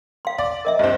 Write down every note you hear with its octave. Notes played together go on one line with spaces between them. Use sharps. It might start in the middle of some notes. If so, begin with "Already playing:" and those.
F5 C6
D5
A#4 D#5 E5
G2 C4 D#5